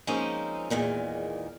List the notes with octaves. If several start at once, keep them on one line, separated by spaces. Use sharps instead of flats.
F3 G#3 A#3 C4 C#4 D#4
E2 A#2 D#3 G#3